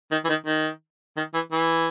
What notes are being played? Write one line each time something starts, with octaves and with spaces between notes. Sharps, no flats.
D#3
E3
D#3
D#3
D#3
E3
E3